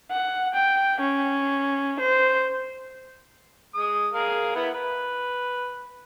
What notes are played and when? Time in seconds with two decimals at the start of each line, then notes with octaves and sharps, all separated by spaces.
0.11 F#5
0.54 G5
1.01 C#4
2.00 C5
3.75 G#3 D#6
4.13 G#4 A#4 F5
4.55 B3 E4 F#5
4.74 B4